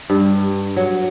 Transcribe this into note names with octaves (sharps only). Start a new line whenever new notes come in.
G2
F#3